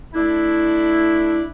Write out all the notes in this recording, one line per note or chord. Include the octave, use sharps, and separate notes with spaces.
A3 D4 E4